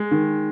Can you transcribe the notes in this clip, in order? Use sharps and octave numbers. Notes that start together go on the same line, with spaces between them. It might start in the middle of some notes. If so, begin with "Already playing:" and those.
Already playing: G#3
D#3